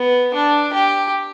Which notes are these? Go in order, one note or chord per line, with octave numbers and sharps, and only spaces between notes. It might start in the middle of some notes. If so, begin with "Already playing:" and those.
Already playing: B3
D4
G4